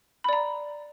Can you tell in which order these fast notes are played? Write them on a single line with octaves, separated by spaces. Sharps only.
B5 D5 A#5